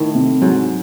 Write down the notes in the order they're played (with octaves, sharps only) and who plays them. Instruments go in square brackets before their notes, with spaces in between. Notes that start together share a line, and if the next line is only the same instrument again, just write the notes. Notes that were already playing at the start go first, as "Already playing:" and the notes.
Already playing: [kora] A2 [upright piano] D#3
[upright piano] C3
[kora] G#2 [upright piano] F#3